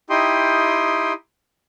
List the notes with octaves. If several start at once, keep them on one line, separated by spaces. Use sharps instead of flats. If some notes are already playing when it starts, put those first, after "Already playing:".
D#4 E4 G4 G5 C6 D#6